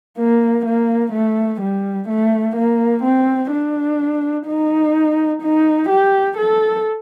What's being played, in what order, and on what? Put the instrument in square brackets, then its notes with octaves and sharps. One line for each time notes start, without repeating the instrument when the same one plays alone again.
[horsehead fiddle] A#3
A#3
A3
G3
A3
A#3
C4
D4
D#4
D#4
G4
A4